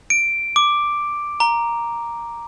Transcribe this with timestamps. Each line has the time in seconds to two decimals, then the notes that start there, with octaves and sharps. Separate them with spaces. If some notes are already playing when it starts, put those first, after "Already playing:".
0.10 D7
0.56 D6
1.40 A#5